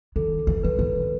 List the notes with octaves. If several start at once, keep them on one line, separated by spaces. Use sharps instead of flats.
D#3 A4
E3
E3 B4
D#3